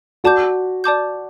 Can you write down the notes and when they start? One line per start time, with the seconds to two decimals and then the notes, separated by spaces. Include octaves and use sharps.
0.24 F#4 D5 A5 D6 G6
0.84 D5 A5 D6 G6